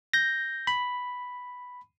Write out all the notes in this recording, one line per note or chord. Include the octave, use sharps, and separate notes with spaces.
G6 A#6
B5